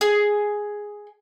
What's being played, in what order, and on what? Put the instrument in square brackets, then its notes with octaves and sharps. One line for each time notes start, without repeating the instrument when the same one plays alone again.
[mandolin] G#4